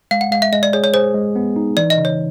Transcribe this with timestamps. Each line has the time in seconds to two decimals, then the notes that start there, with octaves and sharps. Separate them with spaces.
0.11 G#3 F5
0.21 F#5
0.32 G#3 F5
0.42 E5
0.53 G#3 D#5
0.63 D5
0.73 G#4 C#5
0.84 C#5
0.94 G#4 C5
1.14 G#3
1.36 B3
1.56 D#4
1.77 E3 D5
1.90 D#5
1.98 C#3
2.05 C#5